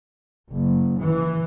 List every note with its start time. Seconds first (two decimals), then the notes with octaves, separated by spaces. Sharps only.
0.50 F#1
0.99 E3